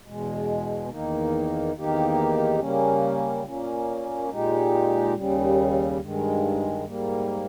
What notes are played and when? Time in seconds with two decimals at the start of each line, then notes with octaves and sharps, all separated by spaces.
0.04 E2 B2 G#3
0.89 E2 D#3 A#3 D#4
1.75 E2 D#3 A#3 D#4 G4
2.59 C#3 G3 A#3 C#4
3.44 A#2 A#3 C#4
4.29 A#2 G#3 D#4 G4
5.15 D#2 C#3 G3
6.00 G2 D#3 G#3
6.85 G#2 G3 A#3